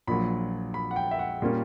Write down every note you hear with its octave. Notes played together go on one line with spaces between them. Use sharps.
A#1 A#2 F#3 B5
B5
F#5
G5
E5
F#5
A#2 G3 A#3 C#4